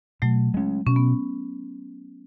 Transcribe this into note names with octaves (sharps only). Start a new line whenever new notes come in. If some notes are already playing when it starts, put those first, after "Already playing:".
B2 F#3 A3
G#3 C#4
B2 C#4
B3